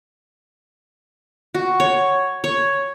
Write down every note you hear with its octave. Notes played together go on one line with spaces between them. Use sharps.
F#4
C#5
C#5